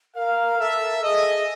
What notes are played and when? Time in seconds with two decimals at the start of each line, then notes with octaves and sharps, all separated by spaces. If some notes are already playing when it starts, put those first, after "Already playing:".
0.15 A#4 F5
0.59 A4 E5
1.03 G#4 D#5